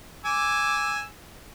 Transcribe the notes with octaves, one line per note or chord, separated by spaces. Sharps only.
G#5 D6 E6